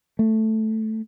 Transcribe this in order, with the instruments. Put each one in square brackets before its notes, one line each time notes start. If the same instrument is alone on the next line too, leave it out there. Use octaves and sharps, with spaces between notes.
[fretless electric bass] A3